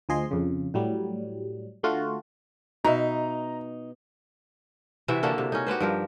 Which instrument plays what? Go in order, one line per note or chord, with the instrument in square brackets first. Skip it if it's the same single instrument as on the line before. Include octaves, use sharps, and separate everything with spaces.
[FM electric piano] D2 F3 G#4 D#5 C6
F2 C#3
A2 F#3 G3
D3 A3 F4 F#4
[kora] B2 E5 [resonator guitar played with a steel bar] D#4 [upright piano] A#5
[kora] C3 E3 F#4 E5
D3 A#3 F#4 A4
C3
C#4 D#4
F#4 G4 B4 C5
G2 F3 A#4